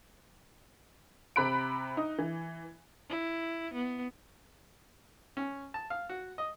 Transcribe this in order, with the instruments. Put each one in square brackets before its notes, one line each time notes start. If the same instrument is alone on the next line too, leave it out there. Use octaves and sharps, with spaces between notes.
[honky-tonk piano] C3 A#5 B5 F#6 D7
D#4 D#6
E3
[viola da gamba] E4
B3
[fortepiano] C#4
A5
F5
F#4
D#5